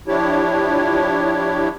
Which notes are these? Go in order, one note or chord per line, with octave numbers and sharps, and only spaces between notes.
F3 D4 E4 G4 C#5